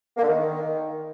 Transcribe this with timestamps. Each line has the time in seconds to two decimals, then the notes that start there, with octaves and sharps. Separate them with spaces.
0.17 A#3
0.23 D3
0.29 D#3